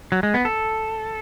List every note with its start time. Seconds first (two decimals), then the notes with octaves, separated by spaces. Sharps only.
0.12 F#3
0.23 G#3
0.34 B3
0.45 A4